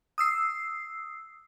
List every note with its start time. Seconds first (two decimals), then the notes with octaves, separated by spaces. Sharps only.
0.18 D#6 E6 C7